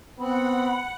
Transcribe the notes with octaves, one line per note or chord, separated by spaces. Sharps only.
B3 C4 F#5 B5